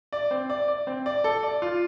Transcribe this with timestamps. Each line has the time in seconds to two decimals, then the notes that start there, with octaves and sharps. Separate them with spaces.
0.13 D5
0.31 C4
0.50 D5
0.68 D5
0.87 C4
1.06 D5
1.24 A4
1.43 D5
1.62 F4